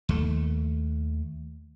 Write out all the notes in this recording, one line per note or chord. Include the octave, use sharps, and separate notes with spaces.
D#2 A3